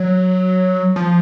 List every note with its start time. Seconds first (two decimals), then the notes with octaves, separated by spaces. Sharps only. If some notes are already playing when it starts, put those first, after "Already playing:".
Already playing: F#3
0.96 F3